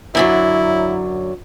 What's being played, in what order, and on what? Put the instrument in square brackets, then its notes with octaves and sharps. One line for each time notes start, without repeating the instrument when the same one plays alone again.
[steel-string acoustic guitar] F#2 D3 F#3 [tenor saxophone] E4